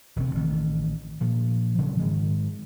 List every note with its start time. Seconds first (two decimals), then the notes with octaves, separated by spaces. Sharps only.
0.16 E1 D2 C3 C4
0.35 A1 D#3
1.21 A#2 F3
1.78 C#3 F3 F#3 C4
1.99 G#2 D#3 G#3